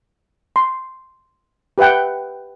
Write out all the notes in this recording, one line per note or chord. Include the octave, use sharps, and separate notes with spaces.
C6
G4 B4 E5 F#5 G5